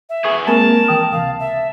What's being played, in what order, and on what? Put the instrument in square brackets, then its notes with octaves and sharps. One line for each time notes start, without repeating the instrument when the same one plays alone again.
[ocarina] E5
[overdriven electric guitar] B3 G#4 [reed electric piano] C#6
[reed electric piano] G#3 A#3 C4 [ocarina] A#4 [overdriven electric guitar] A5
[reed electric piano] E3 G5 D#6
[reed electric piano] C#2 C3 [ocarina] F5
[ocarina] E5